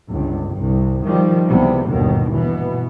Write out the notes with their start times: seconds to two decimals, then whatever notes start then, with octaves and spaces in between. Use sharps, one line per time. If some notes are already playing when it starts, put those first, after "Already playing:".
0.11 G1 C#2 G2
0.51 C2 G2
1.03 D#3 F3 G3
1.49 C#2 C3 E3 G3 B3
1.88 G1 D#2 G#2 B2 D#3
2.33 B2 E3 B3